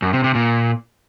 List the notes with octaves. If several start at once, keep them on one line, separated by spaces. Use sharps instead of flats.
F#2
C3
C3
A#2